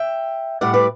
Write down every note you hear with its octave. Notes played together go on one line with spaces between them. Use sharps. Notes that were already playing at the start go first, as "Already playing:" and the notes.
Already playing: E5 G5
A2 G3 D5 F#5
B4 D5